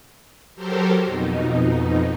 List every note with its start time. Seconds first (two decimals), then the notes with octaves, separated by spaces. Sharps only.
0.56 F#3 G4 A4 A#4 C5
1.04 F2 B2 D#4